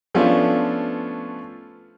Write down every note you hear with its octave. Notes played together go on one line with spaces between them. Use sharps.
F3 A3 B3 C#4 D4 F4